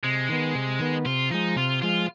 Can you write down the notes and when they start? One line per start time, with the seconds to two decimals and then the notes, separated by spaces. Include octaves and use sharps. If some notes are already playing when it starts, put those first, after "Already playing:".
0.04 C3 G#3
0.29 D#3 B3
0.55 C3
0.79 D#3 B3
1.05 C3 F4
1.31 F3 G#3 D#4
1.56 C3 F4
1.82 F3 G#3 F4